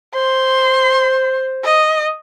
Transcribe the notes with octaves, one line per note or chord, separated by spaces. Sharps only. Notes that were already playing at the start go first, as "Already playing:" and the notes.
C5 C6
D#5